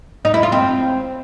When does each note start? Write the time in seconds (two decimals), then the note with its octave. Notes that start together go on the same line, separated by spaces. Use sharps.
0.25 D#4
0.34 E4
0.43 F4
0.52 C4